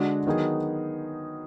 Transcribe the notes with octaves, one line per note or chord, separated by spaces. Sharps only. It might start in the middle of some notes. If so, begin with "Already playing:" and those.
Already playing: D3 G#3 D4 F#4
D#3 F#3 B3 D#4 G#4